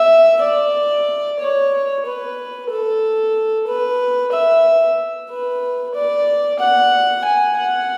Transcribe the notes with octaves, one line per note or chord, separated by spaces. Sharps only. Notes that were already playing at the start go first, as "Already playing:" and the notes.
Already playing: E5
D5
C#5
B4
A4
B4
E5
B4
D5
F#5
G#5
F#5